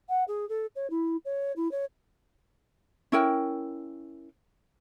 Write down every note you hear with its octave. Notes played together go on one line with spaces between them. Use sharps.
F#5
G#4
A4
C#5
E4
C#5
E4
C#5
C#4 E4 A#4 G5